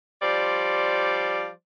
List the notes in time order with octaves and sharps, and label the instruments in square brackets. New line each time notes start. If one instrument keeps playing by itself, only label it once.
[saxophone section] F3 G3 C5 D5